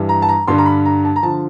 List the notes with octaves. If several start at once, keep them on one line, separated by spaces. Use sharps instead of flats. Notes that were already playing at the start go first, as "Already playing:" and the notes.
Already playing: G2 E3 G3
A#5
A5
A#5
G2 D3 G3 C6
A#5
B5
A#5
A5
A#5
D3 F3 A5